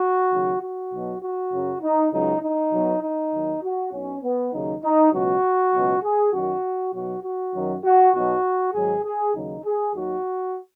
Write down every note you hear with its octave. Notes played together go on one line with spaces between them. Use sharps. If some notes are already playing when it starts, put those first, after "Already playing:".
Already playing: F#4
D#2 C#3 F#3
F#4
B1 B2 F#3
F#4
F#2 C#3 F#3
D#4
C#2 C#3 F#3 D#4
D#4
B1 B2 F#3
D#4
D#2 D#3 F#3
F#4
B1 B2 F#3 C#4
B3
D#2 C#3 F#3 D#4
D#4
C#2 B2 F#3 F#4
C#2 B2 F#3
G#4
F#2 D#3 F#3 F#4
B1 B2 F#3 F#4
F#4
F#2 D#3 F#3
F#4
B1 B2 F#3 F#4
G#1 G#2 F#3 G#4
G#4
D#2 C#3 F#3 D#4
G#4
D#2 D#3 F#3 F#4